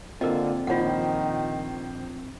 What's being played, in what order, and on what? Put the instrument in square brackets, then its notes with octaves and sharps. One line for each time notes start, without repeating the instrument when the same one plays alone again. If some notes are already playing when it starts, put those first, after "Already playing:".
[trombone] D3 [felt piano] A#3 F4 [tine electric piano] C4 [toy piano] A#4 D5 D#5
[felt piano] A#1 C5 [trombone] D#3 [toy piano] F4 F#5